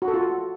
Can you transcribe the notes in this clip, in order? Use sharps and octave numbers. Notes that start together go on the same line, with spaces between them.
F#4
A4
F4